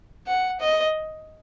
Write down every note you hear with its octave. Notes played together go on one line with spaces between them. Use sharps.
F#5
D#5